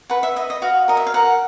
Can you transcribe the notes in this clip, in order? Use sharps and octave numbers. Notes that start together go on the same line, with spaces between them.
B4 F#5
E5
D#5 E5
D#5
F#4 F5
A#4 D#5
E5
F5
A#4 F#5